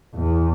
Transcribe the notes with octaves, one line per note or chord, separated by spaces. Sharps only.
E2